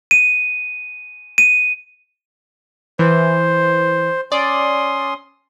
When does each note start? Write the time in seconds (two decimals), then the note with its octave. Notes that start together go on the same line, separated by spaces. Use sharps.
0.11 D#7
1.38 D#7
2.99 E3 C5
4.32 C#4 D5 C6 D#6